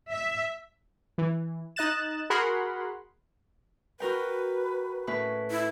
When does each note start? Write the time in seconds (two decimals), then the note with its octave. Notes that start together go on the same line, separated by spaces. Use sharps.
0.11 E5
1.18 E3
1.76 D#4 D#5 F#6 A6 E7
2.30 F#4 G#4 A#4 F#5 B5 C6
4.00 F#4 A#4 B4 G5
5.07 A2 C#4 B4
5.51 E4